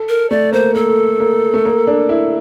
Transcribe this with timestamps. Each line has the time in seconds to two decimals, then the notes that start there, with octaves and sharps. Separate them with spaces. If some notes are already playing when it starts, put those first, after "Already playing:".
Already playing: A4
0.09 A#4
0.30 A3 D5
0.52 A#3 C5
0.75 A#3 A4
1.20 A#3
1.54 A3
1.65 A#3
1.87 D4
2.09 E4